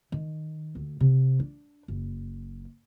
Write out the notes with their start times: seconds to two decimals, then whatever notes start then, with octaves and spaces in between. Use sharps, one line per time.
0.12 D#3
0.75 D2
1.00 C3
1.40 D4
1.88 F#1